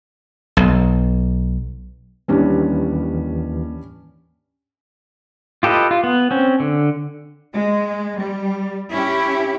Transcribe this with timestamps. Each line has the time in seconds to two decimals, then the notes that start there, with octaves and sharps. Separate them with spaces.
0.57 B1
2.28 D#2 E3 G3 C#4 D4
5.63 F4 G4 A4 B4 D#5
5.91 F4
6.04 B3
6.31 C4 C#4
6.60 D3
7.53 G#3
8.17 G3
8.91 C#4 E4 G4